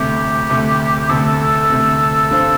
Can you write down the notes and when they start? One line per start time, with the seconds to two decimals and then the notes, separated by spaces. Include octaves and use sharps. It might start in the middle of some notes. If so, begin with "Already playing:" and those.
Already playing: D2 C3 A3 G4
0.50 D2 C3 A3
1.09 D2 C3 A3 A4
1.69 D2 C3 A3
2.30 G1 G2 D3 C4